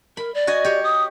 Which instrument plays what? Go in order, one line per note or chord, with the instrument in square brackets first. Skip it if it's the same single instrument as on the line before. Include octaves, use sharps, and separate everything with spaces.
[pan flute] A#4 [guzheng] B5
[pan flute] D5
[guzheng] F#4 D#5 G#5
G4 C#5
[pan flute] D#6